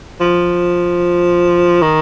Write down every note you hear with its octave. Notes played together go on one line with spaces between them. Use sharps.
F3
D#3